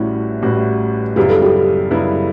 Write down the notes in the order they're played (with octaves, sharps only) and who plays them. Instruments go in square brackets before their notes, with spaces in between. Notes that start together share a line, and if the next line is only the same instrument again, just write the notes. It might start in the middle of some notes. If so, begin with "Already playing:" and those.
Already playing: [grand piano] A1 A2 G3 C#4 F#4 [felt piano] E4
[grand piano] A1 A2 G3 C#4 F#4
[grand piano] F#2 C#3 G3 B3 E4 [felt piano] G4
[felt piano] A4
G4
[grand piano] F#2 C#3 G3 B3 E4